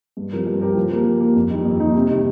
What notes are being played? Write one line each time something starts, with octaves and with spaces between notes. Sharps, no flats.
G2
F3 C4 G4 A#4
G2
F3 C4 G4 A#4
F3
A#3 G4 A#4
F3
A#3 G4 A#4
F2
D#3 G3 A#3 D#4
F2
D#3 G3 A#3 D#4
C3
D#3 G3